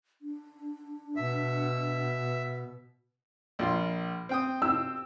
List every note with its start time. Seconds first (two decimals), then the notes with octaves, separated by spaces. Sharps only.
0.22 D4
1.17 B2 E5
3.59 A#1 F4 C6
4.29 C4 G5 D#6
4.62 E6